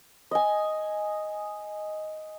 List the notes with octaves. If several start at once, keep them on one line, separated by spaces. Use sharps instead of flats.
D#5 G#5